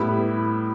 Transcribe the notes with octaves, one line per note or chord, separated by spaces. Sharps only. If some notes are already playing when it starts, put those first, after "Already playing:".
Already playing: A2 G3 B3 E4 B5